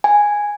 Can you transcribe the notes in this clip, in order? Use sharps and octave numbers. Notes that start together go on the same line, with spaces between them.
G#5